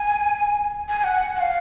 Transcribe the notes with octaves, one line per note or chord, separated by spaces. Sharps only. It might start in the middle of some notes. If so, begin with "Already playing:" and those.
Already playing: G#5
G#5
G#5
F#5
F#5
F5